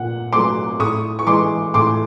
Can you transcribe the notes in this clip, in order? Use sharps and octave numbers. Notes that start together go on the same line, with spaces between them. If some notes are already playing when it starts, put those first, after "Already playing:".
Already playing: A#2 F#5
F#3 A3 C6 D6
A2 C#6 D#6
C#6
E3 G#3 C6 D6
A2 C6 D6